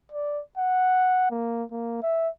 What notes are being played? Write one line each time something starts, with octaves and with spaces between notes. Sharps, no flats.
D5
F#5
A#3
A#3
E5